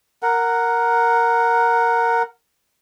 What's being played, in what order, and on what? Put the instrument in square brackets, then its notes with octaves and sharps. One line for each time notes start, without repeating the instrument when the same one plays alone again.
[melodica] A#4 F#5